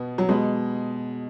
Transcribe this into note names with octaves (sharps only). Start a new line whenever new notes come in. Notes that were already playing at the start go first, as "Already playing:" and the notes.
Already playing: B2 B3
F#3
B2 G#3